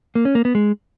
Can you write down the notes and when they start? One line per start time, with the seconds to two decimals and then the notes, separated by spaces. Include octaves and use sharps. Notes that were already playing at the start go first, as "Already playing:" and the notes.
0.15 A#3
0.25 C#4
0.35 A#3
0.45 B3
0.55 G#3